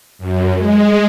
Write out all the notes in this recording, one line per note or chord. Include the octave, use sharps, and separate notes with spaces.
F#2
G#3